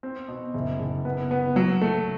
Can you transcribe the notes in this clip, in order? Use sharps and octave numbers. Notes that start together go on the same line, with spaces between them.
C4
B2
F#1
F#1
B3
B3
F#3
A3